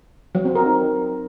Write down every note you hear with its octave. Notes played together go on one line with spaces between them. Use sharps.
F#3
C4
A#4
D#4